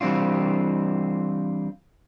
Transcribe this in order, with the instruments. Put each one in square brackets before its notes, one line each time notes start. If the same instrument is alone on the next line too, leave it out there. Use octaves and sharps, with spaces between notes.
[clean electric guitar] E3 G3 C4 D4 F4